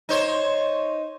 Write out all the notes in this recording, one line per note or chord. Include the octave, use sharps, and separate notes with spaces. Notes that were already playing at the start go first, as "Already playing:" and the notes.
D#4 C5 C#5